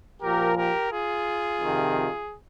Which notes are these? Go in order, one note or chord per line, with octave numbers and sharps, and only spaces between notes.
A#2 F3 G4 A#4
G4 A#4
F4 G#4
F2 C3 D#3